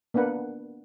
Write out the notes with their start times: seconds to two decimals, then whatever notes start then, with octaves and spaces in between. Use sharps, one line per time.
0.14 A#3 B3 D4 B4 F#5